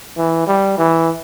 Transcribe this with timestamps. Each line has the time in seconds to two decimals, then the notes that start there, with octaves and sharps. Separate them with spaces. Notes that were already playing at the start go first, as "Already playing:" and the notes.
0.17 E3
0.47 G3
0.78 E3